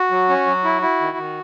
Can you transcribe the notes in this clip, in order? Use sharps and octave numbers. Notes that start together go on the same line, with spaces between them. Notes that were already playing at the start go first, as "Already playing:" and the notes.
Already playing: F#4
F#3
C#4
F#3
E4
E4
D#3
D#3